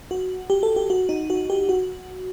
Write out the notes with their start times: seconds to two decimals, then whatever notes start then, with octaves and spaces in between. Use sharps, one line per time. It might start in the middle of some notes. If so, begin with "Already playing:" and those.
0.11 F#4
0.50 G4
0.63 A4
0.76 G4
0.90 F#4
1.09 D#4
1.30 F#4
1.50 G4
1.69 F#4